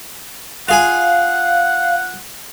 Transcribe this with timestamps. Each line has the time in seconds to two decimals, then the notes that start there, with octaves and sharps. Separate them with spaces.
0.69 F4 G#4 F5 F#5 G#5